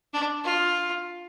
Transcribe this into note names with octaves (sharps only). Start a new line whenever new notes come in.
D4
F4